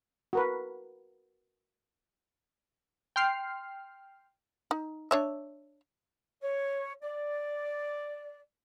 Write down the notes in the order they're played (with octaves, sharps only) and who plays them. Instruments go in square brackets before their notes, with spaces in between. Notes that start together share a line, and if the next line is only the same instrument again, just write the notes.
[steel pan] F#4 A#4 B4
[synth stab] G5 C6 F6 C7
[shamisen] D#4
D4 C#5 E5
[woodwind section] C#5
D5